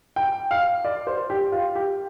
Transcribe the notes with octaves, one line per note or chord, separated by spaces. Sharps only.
G5
F5
D5
C5
G4
F4
G4